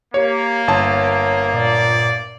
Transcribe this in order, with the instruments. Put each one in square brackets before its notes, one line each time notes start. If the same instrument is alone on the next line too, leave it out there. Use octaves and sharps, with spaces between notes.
[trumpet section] A#3 [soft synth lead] G4 [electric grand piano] C#5
[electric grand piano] G1 A5 [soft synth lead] C#5
[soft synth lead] A#2 [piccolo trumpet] D5